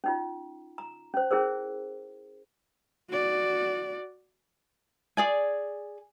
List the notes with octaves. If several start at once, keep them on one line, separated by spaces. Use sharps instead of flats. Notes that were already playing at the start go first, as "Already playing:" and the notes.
C#4 D#4 F4
A#5
C#4 C5
C#4 E4 G#4 A#4 C5
F#4 D5
G#4 D5 G#5